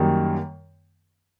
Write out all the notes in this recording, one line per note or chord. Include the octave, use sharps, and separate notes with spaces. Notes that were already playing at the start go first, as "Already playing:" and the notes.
Already playing: F#2 D#3 G3 A#3